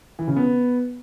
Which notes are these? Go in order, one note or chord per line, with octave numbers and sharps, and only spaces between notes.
E3
C#3
B3